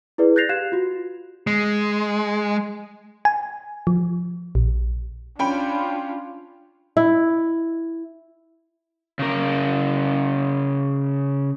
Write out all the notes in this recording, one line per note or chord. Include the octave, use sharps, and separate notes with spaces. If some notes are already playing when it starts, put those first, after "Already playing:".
E4 G#4 B4 D5
F#6 G6 A6 A#6 C7 F7
G4 F5 F#6 G#6 C7 E7
F4 F#4
G#3
G#5
F3
A#1
C#4 D4 F4 G5 B5
E4
C#3 A#4